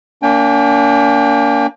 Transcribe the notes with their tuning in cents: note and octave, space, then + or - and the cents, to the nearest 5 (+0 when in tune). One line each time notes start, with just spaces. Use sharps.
A#3 +0 D4 -45 G5 +30